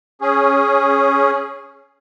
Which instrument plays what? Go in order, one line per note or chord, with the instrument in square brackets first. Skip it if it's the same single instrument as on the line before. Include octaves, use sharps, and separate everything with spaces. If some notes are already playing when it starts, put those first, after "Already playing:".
[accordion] C#4 G#4